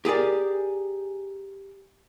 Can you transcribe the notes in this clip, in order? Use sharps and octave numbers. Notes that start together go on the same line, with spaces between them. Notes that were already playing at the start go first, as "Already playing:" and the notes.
G4 G#4 A#4 D5